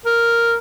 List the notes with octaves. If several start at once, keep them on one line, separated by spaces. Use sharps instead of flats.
A#4